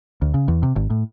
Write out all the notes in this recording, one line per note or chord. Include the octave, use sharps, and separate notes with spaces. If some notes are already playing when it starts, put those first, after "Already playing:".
D2
C#3
E2
C3
G#1
A2